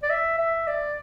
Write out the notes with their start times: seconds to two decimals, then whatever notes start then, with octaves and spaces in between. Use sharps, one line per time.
0.03 D5
0.10 E5
0.39 E5
0.68 D5